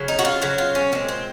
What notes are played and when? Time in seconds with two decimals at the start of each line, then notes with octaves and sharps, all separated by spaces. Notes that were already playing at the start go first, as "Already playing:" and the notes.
Already playing: C#3 F#3
0.08 D#4
0.19 F#4
0.25 F4
0.42 C#3 F#3 F#4
0.58 F4
0.75 C#4
0.92 A#2 G#3 C4
1.08 C4